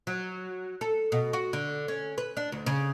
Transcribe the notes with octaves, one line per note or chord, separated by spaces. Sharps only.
F#3
A4
B2
F#4
D3
C#4
B4
D4
D2
C#3